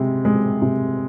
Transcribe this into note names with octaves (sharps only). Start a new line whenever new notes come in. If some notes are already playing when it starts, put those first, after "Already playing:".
Already playing: C3 G#3
G#3
C3